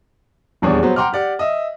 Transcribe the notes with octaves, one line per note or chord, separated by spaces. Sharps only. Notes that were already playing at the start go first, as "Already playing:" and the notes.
D#1 E2 D4 G#4 C#5
F#3 B3 C5
F#5 G5 A#5 C6 D6 F6
G4 D5 F#5
D#5 E5